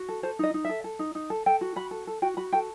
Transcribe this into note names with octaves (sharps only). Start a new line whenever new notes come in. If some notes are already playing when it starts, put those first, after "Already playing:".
Already playing: F#4
A4
A4 C5
D#4 D#5
D#4
A4 E5
A4
D#4
D#4
A4
A4 G5
F#4
F#4 B5
A4
A4
F#4 G5
F#4 B5
A4 G5